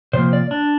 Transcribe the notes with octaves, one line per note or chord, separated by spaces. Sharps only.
C3 F3 A#3 C5
D5
D4